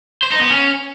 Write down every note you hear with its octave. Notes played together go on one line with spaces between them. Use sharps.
C5
D#4
B3
C#4